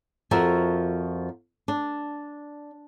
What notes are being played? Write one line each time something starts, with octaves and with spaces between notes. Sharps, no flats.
F2 F3 F#4 A#4 E5
D4